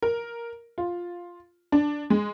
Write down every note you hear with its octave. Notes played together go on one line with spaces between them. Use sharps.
A#4
F4
D4
G#3